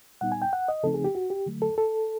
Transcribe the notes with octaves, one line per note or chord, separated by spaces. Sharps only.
A#2 G3 B3 D#4 F#5
G#5
G5
F#5
D#5
C#3 F3 A3 C4 D#4 A4
G#4
G4
F#4
G4
D3 F#3 A3
A4
A4